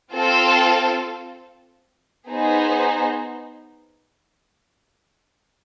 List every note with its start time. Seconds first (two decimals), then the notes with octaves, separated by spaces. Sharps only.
0.14 C4 F4 A4
2.28 B3 D#4 G#4 C5